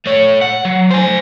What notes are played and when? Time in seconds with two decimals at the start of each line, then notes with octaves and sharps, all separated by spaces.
0.06 A3 C#5
0.42 F#5
0.65 F#3
0.90 C5 G#5